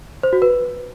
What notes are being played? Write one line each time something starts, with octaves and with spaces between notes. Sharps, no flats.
C5
F#4
B4